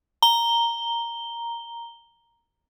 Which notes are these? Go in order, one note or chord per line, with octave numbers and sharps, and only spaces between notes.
A#5 G7